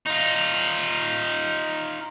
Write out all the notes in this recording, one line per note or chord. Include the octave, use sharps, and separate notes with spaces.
D#4 F4